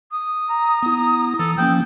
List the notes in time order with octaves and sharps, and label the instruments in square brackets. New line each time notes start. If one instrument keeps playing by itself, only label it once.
[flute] D#6
[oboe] A#5
[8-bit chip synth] B3 E4
[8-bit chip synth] E3 [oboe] A4 [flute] D#6
[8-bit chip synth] F3 A#3 C#4 [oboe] G5